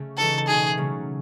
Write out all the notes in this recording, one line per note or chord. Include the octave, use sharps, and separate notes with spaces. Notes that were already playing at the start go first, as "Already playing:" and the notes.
Already playing: C#3 A3 C#4
E3 G#3 D#4 F#4 A4
B2 A3 D#4 F#4 G#4
C#3 F#3 A3 C#4